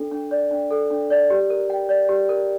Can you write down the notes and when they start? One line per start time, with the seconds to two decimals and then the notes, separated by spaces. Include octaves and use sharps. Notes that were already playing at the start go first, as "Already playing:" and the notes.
Already playing: D4 A4
0.11 D4
0.31 D5
0.51 D4
0.70 A4
0.91 D4
1.10 D5
1.30 G4
1.50 A#4
1.70 G5
1.89 D5
2.09 G4
2.29 A#4